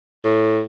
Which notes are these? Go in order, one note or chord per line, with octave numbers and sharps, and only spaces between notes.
A2